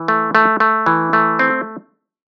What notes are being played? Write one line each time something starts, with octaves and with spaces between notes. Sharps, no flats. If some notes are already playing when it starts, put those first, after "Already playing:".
Already playing: E3
A3
A3
A3
E3
A3
C4